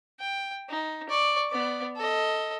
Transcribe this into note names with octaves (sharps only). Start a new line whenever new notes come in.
G5
D#4
D5 C#6
B3 D5
A4 D#5